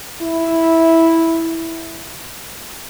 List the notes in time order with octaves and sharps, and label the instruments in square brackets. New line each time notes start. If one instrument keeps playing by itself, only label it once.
[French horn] E4